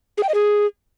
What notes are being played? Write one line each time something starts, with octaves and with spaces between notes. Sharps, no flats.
G#4
G5
D#5
G#4